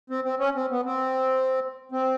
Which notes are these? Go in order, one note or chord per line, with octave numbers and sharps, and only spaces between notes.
C4
C4
C#4
C4
B3
C4
C4